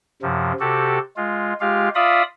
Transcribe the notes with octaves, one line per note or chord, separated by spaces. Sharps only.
F#2 C3 F3
C3 F#4 G4 A4
G#3 F4
G#3 F4 G4 F5
F4 D5 E5 F5 B5 D#6